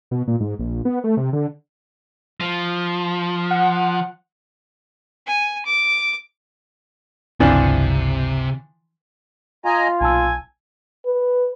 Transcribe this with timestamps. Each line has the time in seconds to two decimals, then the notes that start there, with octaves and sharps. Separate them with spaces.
0.11 B2
0.27 A#2
0.40 G#2
0.59 A#1
0.85 B3
1.04 A3
1.17 C3
1.33 D3
2.40 F3
3.51 F#5
5.27 G#5
5.66 D6
7.40 G1 C#2 C3 E3 F3 C4 D4
9.65 F4 D#5 G#5 A#5
10.01 B1 A#2 G#5 A5 E6
11.06 B4